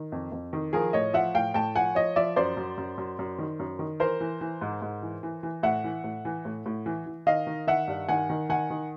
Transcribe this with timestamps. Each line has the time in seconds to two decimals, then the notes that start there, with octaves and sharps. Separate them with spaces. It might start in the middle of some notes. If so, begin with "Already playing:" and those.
Already playing: D#3
0.12 F2
0.32 F2
0.53 D#3
0.73 F3 G#4 A#4
0.93 A2 C#5 D#5
1.13 F3 E5 F#5
1.34 A2 F5 G5
1.54 A2 G5 A5
1.75 F3 F#5 G#5
1.95 F3 C#5 D#5
2.16 F3 D5 E5
2.36 F#2 C5 D5
2.57 F#2
2.78 F#2
2.98 F#2
3.19 F#2
3.38 D#3
3.59 F#2
3.79 D#3
4.00 E3 A#4 C5
4.20 E3
4.41 E3
4.61 G#2
4.82 G#2
5.02 E3
5.23 E3
5.43 E3
5.63 A2 E5 F#5
5.84 E3
6.04 A2
6.25 E3
6.45 A2
6.66 A2
6.86 E3
7.06 E3
7.26 D#3 D#5 F5
7.47 D#3
7.67 D#3 E5 F#5
7.88 G2
8.09 D#3 F#5 G#5
8.30 D#3
8.49 D#3 F#5 G#5
8.70 D#3